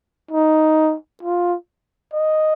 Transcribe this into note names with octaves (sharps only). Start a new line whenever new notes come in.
D#4
F4
D#5